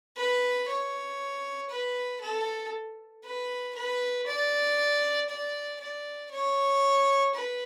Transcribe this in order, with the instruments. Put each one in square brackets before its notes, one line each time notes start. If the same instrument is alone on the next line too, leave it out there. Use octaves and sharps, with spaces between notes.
[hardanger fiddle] B4
C#5
B4
A4
B4
B4
D5
D5
D5
C#5
B4